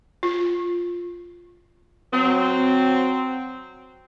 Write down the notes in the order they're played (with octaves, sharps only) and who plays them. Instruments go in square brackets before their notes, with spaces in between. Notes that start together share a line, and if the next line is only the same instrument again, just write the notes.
[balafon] F4
[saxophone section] F#3 C4